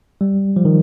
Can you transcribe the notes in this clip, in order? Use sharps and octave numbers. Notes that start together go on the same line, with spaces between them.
G3
F3
D#3